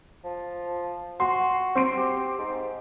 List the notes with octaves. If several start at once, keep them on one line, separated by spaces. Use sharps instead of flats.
F3
F#4 C6
C4 C6 D7
G4
G#2